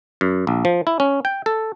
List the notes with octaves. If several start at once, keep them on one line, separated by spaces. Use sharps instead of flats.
F#2
A#1
F3
E4
C#4
G5
A4